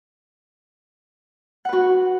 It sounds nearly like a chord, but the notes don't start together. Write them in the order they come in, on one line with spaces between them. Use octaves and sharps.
F#5 B4 F#4